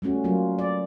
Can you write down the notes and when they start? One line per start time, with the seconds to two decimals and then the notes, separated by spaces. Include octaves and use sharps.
0.02 G3 A3 C#4 F#4
0.24 F#3 A#3 F4
0.59 D5